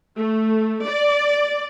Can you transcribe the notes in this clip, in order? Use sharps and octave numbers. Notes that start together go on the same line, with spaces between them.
A3
D5